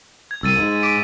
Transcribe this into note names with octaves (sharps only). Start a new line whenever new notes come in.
G#6
C2 E6 A6 D#7
G#2
D6 B6 D7